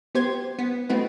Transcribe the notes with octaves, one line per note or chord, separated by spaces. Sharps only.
B3 G4 C5 C6 G#6
B3
A3 B3 C4 D#4 F#4 B4